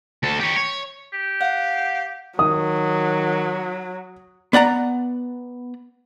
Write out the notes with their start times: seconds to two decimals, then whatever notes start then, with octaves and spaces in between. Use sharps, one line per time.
0.23 D2 A4
0.40 G4 C#5
0.56 C#5
1.13 G4
1.41 F5 F#5
2.39 D#3 F#3 D#6
4.53 B3 D5 F#5 A#5